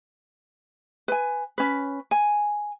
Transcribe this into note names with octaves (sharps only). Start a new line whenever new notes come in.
B4 G#5
C#4 B4
G#5